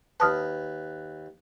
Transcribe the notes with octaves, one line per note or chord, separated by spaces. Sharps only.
D#2 B4 A5 D#6 F6